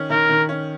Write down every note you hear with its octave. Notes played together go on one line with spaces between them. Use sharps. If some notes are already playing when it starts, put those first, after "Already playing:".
Already playing: D#3 C#4
D#3 A#4
D#3
C#4